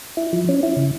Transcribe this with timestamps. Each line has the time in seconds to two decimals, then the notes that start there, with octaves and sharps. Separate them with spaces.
0.17 E4
0.33 F3
0.49 C#4
0.63 E4
0.77 C#3